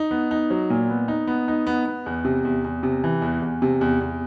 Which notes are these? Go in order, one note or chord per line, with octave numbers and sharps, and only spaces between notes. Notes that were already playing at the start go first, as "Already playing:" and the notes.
Already playing: D#4
B3
D#4
F#3
A#2
B3
D#4
B3
D#4
B3
B3
E2
C3
E2
E2
C3
E3
E2
E2
C3
E2
E2